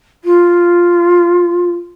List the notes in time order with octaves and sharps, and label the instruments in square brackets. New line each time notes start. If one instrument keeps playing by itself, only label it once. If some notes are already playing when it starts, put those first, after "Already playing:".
[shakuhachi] F4